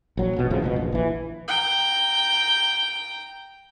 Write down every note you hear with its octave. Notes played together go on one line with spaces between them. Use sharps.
A#1 F#3
E1 B2
E2 A2 C#3 F3
F1 C#2 B2
A#1
A#1 E3
G5 A#5